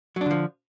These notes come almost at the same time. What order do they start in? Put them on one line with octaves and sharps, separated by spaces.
F#3 D4 D3 F3